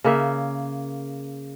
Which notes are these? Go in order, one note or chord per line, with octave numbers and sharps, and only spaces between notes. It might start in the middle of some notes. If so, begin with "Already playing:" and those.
C#3 A#3 E5